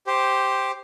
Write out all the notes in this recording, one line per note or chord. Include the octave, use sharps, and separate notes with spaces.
G4 C5